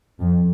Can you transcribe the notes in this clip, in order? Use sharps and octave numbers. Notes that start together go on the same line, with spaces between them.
F2